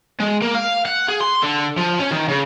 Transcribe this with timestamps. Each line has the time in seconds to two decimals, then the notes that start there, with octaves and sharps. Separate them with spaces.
0.20 G#3
0.42 A#3
0.55 F5
0.85 F#5
1.08 G#4
1.21 C6
1.42 D3
1.77 F3
1.99 C#4
2.11 D#3
2.28 C#3